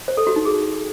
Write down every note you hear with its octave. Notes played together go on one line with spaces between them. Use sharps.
C5
A4
F#4
D#4
G#4